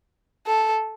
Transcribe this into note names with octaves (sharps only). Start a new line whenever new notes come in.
A4